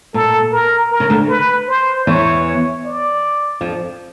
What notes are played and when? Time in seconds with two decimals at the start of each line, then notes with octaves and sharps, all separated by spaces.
0.14 A#2 A4
0.53 A#4
0.91 A#4
1.00 C#3
1.10 D2 D3
1.29 B4
1.68 C5
2.07 E2 E3 C#5
2.84 D5
3.61 F2 F3